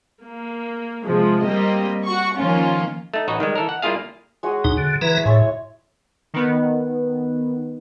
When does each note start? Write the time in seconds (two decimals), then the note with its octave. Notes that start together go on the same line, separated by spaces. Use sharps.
0.23 A#3
1.05 C3 F3 G#3
1.43 G3 A#3 C4 G4 D#5
2.05 F#4 C#6
2.37 D#3 F3 A#3 C#4 F4
3.14 A3 D#4
3.28 A1 D#4 F#4 B4 C#5 D#5
3.40 D#3 G3 G#3
3.55 E3 A4 A#4
3.69 F#5
3.82 G3 A#3 E4 F4 G#4 F5
4.43 G#3 F#4 D#5
4.64 D#2 B2 D#4
4.77 D3
5.01 E3 E4 B4 A#5
5.25 A2 G#3 C#5 E5
6.34 D#3 B3